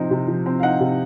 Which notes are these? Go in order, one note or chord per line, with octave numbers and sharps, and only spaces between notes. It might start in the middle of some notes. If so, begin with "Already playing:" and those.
Already playing: C3 F3 C4 D#4
C3
F3
C4
F5
D#4 F#5
C3